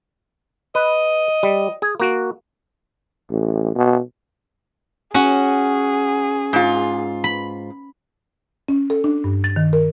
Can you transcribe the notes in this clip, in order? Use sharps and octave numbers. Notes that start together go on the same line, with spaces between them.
B4 D#5
G3
G#4 G#5
A#3 F#4
A1
B2
C#4 F#4 G#4
G#2 F4
B5
C#4
A4
D4
G2
A6
D#3
A#4